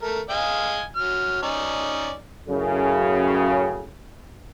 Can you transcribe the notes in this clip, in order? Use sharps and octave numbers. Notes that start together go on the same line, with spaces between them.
A3 A#4
D#5 F5 G#5
F#3 F6
C#4 D#4 D5
F#2 A2 C#3